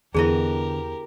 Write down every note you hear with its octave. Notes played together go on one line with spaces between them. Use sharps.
E2 D3 B3 E4 G4 G#4 A#4 D#5